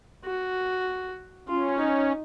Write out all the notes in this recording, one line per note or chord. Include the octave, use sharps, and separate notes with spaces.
F#4
C#4 F4
D#4